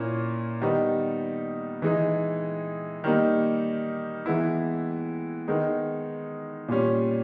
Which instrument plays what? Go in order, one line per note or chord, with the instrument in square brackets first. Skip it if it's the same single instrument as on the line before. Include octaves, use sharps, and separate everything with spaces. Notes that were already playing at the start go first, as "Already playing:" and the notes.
Already playing: [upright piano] A#2 A#3 C#4 E4
D#3 G3 B3 D#4
E3 G#3 D#4
D#3 G3 A#3 D#4
E3 G#3 B3 E4
D#3 G#3 B3 D#4
A#2 G3 C#4